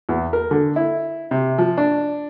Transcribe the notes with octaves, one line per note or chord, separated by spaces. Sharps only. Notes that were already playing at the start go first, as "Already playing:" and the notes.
E2
A#4
D3
E4
C3
F3
D4